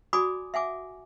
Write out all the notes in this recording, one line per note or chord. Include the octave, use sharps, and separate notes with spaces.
F#4 D5 G#5 B5 D6 D#6
E5 F#5 G#5 D6